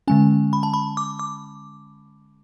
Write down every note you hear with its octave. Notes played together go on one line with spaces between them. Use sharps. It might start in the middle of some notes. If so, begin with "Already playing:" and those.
D3 G#3 C#4 G#5
B5
A5
B5
D6
D6